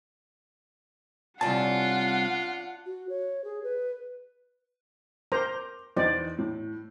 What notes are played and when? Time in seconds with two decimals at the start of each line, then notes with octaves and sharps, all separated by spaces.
1.41 C2 C#4 D4 F4 F#5 A5
2.86 F#4
3.09 C#5
3.44 G#4
3.63 B4
5.32 A#4 C5 A#5 D6
5.97 E2 B3 D#4 C5 D5
6.38 A2